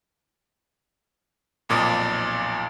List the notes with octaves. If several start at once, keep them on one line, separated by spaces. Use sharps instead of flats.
B1 F2 A#2 D6 D#6